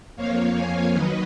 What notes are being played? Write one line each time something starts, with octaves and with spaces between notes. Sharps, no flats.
F2 F3 A#3 C#5 F5
F5 G#5
D#3 F#3 B4 D#5